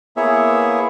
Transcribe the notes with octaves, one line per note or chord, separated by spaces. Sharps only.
A#3 B3 E4 G#4 C#5 E5